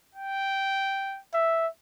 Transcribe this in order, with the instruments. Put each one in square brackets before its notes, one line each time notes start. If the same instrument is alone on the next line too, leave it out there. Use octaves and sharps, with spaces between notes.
[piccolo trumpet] G5
[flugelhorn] E5